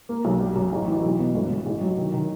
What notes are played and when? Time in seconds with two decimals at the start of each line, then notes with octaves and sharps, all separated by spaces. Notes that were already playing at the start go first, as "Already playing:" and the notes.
0.09 A#3
0.25 B1
0.40 G3
0.56 F#2
0.72 A1
0.88 E3
1.04 B1
1.19 B2
1.34 G1
1.50 G1
1.66 A1
1.81 F#3
1.98 D#3
2.14 D#3